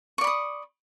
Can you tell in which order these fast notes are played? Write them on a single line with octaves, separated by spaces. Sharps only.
C#6 D5 B5 D#6